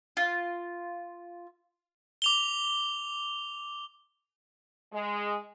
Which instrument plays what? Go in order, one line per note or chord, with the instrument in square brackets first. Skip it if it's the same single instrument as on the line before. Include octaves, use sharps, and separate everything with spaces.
[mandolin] F4
[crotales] D6 F7 G7
[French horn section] G#3